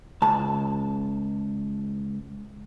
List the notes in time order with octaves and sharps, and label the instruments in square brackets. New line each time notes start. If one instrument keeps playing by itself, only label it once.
[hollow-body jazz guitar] C#2 A5